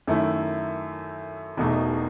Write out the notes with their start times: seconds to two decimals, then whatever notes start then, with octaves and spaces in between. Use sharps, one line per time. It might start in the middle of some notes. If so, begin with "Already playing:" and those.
0.07 F#2 D#3 A3 E4
1.57 E1 E2 B2 A3 D#4